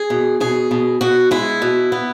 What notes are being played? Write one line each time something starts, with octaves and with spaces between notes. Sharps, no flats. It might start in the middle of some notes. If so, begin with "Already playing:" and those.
Already playing: G#4
B2
B2 G#4
B2
B2 F#4
G#3 E4
B2
B3